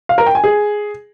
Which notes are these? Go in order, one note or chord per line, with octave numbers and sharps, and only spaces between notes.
F5
A#4
G5
G#5
G#4